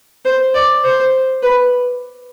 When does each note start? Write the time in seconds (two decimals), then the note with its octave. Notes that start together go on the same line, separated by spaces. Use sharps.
0.25 C5
0.54 D5
0.84 C5
1.43 B4